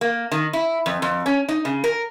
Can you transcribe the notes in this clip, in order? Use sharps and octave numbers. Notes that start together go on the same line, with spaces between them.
A#3
D#3
E4
F2
F2
C#4
D#4
C#3
A#4